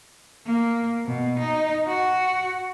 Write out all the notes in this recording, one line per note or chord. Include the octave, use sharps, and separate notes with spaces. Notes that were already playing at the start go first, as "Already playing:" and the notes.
A#3
B2
D#4
F#4